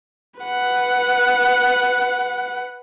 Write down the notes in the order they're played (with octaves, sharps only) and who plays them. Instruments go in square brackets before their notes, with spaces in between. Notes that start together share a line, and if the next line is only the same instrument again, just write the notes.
[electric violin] B4 F#5